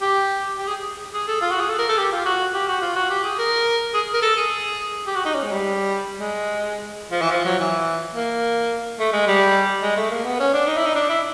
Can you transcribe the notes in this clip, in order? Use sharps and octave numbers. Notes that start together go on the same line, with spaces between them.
G4
G4
G#4
G#4
A4
F4
F#4
G#4
A4
A#4
A4
G4
F4
F#4
G4
F#4
F4
F#4
G4
G#4
A#4
G#4
A#4
A4
G#4
G4
F#4
D#4
C#4
G#3
G3
G#3
F3
E3
F3
F#3
E3
A#3
A3
G#3
G3
G#3
A3
A#3
B3
C#4
D4
D#4
E4
D#4
D4
E4